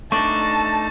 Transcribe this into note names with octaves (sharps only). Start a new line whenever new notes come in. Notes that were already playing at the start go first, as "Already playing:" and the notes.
A3 D4 D#4 A5 C#6